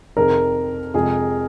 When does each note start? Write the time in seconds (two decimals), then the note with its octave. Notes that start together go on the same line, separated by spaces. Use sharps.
0.17 F2 C3 D#3 C4 G#4 A#4
0.94 F2 C3 G#3 F4 G#4